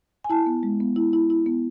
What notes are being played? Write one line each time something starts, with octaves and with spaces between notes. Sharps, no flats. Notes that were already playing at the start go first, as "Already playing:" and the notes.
G#5
E4 A5
B3
G#3
B3
E4
E4
E4
B3